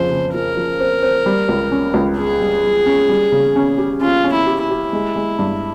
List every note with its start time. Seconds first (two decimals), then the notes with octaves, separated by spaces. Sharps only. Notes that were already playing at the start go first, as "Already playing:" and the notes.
Already playing: F2 C#3 C5
0.11 C#3
0.34 F3 A#4
0.57 F3
0.80 C4
1.03 C4
1.26 G3
1.49 C#2
1.71 C#4
1.94 C#2
2.17 C#4 G#4
2.40 G3
2.63 G3
2.86 C#4
3.09 G3
3.32 C#3
3.56 C#4
3.78 G4
4.01 C#4 F4
4.24 C#4
4.32 E4
4.47 G4
4.62 E4
4.71 G4
4.93 G#3
5.16 G#3
5.39 G2